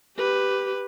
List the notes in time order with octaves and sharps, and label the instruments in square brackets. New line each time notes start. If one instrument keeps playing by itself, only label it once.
[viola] G4 B4